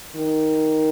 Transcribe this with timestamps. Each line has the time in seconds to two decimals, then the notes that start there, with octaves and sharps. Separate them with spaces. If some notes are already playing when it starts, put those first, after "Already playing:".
0.16 D#3